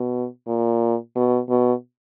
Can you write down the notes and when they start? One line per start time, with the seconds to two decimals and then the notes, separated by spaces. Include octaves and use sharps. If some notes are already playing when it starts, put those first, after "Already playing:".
Already playing: B2
0.47 A#2
1.16 B2
1.49 B2